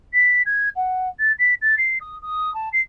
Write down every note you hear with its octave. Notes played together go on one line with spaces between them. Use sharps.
B6
G#6
F#5
A6
B6
A6
C7
D#6
D#6
A5
C7